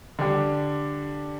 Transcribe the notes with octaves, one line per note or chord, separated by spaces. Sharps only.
D3 G3 D4 G4